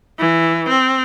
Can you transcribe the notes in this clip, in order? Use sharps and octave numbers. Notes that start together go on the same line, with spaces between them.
E3
C4